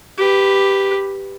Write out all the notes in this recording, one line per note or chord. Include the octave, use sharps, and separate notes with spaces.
G4 B4